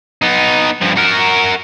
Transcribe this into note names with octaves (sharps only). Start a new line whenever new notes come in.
B3 D#4
G2 F3
F#4 A#4